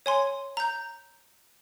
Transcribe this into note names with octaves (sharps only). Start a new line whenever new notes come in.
C#5 G#5 C6
A#5 G6